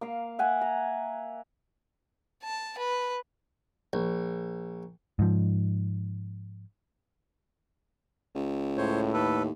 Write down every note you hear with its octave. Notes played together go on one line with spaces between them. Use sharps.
A#3 F5
E5 F#5 G#5
A#5
A5
B4
A#1
G#2 F3
C#2
A2 C5 C#5
D#2 A4 B4